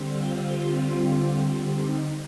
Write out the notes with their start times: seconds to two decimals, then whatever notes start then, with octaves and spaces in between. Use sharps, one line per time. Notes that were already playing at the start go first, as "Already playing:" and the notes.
Already playing: D3 G3 C4
0.10 F4
1.75 D#4